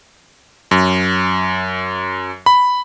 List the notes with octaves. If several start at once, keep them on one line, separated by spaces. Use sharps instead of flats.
F#2
B5